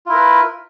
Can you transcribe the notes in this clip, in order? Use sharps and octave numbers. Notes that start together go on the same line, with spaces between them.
E4 F4 A#4 B4